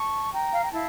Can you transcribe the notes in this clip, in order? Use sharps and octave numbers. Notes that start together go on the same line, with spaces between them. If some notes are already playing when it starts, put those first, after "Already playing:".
Already playing: A5 C#6
G5 A#5
F5
G5
E4 F5 A5